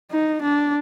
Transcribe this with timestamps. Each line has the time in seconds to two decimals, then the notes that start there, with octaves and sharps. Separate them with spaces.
0.11 D#4
0.42 D4